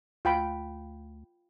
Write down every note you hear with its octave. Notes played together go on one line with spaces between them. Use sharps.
D2 F4 G5 B5